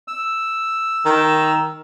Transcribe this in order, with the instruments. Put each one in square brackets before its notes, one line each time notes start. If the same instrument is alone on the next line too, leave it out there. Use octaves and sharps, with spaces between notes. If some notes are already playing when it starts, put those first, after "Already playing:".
[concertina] E6
[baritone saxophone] D#3